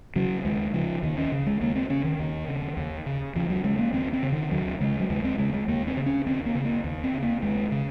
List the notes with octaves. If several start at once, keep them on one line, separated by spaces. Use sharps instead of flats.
C#3 F#3
D#2 G#3
C#3 F3
D#2 D#3
C#4
C#3
G#3
D#2 A#3
C4
C#3 C#4
D#3
D#2
C#3
D#2
C#3
D#2 F3
F#3
C#3 G#3
A#3
D#2 C4
C4
C#3
D#3
D#2 F#3
C#3 G#3
F#3
D#2 G#3
C4
C#3 G#3
G#3
D#2 A#3
C4
C#3
C#4
D#2 C4
A#3
C#3
A#3
D#2
C4
C#3
A#3
D#2 G#3
C#3